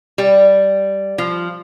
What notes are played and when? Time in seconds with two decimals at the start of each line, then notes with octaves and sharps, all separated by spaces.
0.18 G3
1.18 F3